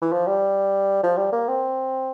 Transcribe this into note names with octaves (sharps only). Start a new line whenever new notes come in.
E3
F3
G3
F3
G3
A#3
C4